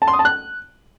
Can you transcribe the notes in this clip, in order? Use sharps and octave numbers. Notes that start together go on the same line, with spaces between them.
A5
C6
D#6
A5
F#6